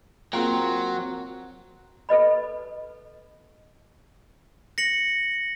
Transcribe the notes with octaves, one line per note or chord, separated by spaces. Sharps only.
F#3 A#3 C4 F4 G#4 A#4 G5 C6
A4 B4 D#5 B5
A#6 C#7 F#7